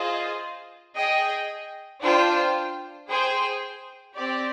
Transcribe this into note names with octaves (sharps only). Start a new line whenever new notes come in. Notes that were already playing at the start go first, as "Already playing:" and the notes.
Already playing: F4 G#4 C5 D#5
G#4 D#5 G5
D4 F4 C5 G5
G#4 C5 G5
C4 G4 D5